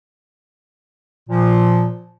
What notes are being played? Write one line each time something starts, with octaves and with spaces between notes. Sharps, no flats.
A#2 F3